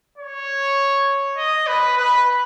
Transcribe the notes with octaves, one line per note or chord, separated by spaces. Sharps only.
C#5
D#5
B4
B4